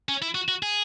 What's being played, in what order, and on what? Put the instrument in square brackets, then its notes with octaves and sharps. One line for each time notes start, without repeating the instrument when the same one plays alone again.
[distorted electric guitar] C#4
E4
F#4
F#4
G#4